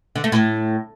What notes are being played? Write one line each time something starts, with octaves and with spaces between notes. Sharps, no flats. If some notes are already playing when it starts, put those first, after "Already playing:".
D3
A3
A2